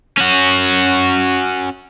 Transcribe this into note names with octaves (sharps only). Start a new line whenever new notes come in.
C#4 F#4